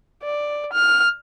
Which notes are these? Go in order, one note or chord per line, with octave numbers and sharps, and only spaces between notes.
D5
F6